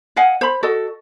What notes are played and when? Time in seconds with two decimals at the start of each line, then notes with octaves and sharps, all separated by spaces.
0.16 D#5 F5 F#5 G#5
0.41 C5 B5
0.63 F#4 A4 D#5